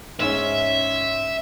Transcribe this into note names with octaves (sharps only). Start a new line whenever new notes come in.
G#2 C#4 E5